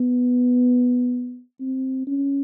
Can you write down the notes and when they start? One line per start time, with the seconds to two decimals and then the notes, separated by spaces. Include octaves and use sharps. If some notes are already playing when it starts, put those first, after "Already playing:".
Already playing: B3
1.60 C4
2.07 C#4